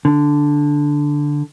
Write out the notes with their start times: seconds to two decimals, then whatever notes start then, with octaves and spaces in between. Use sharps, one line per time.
0.05 D3